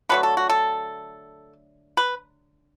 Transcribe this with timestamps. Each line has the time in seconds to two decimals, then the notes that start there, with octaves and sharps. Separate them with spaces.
0.09 D3 F#3 A3 B4
0.23 A4
0.37 F#4
0.49 A4
1.97 B4